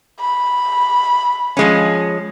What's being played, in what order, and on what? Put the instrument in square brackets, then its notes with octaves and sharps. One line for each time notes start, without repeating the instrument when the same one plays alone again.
[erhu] B5
[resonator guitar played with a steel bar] F3 G#3 C#4